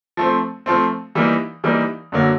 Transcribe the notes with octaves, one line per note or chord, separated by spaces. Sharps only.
F3 A3 C4
F3 A3 C4
E3 G3 A#3 D#4
E3 G3 A#3 D#4
F#2 D3 F#3 A#3